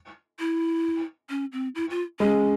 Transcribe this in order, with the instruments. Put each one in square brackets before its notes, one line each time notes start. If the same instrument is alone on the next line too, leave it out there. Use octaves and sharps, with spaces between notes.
[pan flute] E4
C#4
C4
E4
F4
[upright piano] G#3 [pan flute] C#4